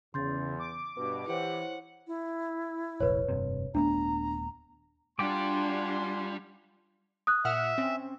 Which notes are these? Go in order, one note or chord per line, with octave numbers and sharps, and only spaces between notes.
E2 C#3 C6 G6 A6
D6
G2 B2 B4
E3 E4 G4 C5 C#5 F#5
E4
F1 A#1 B4 C#5
F1 G2 C3
D#1 A3 B3 D4 A#5
G3 D4 F4 F#4 G5 G#5 C6 D6
D#6 F#6
A#2 E5 F#5 F6
C4 C#4